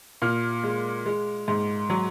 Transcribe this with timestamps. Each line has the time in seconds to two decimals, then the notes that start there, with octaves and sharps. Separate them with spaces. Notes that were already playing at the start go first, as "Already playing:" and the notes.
0.22 A#2 F6
0.64 G#3
1.06 G#3
1.48 G#2
1.90 F#3